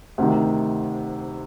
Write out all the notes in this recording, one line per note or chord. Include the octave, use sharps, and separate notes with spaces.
D2 C3 D#3